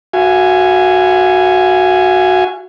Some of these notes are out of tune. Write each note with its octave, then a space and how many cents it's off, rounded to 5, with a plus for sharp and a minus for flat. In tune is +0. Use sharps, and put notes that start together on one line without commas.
F#4 -5 F5 -45 G#5 +0